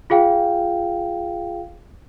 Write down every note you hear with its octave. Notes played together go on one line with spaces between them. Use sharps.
F4 G#4 F5 G5